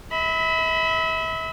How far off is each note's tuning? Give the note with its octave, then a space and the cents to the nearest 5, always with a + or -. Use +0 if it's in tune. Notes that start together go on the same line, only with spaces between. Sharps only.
E5 -35 B5 +15